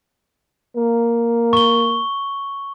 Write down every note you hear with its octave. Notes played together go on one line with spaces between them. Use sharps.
A#3
C#6 G7